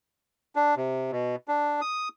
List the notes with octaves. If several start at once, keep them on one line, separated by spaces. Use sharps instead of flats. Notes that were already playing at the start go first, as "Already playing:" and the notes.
D4
C3
B2
D4
D#6